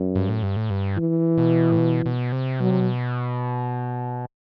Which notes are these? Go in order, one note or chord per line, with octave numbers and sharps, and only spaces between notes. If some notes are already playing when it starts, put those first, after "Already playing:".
Already playing: F#2
G2
A2
G2
A2
G2
E3
B2
A2
B2
B2
C3
B2 F#3
C3
B2